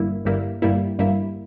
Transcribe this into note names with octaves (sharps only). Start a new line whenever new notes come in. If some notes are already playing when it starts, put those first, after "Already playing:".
Already playing: G1 G2 G3 A#3 E4
G1 G2 G3 A#3 E4
G1 G2 G3 A#3 E4
G1 G2 G3 A#3 E4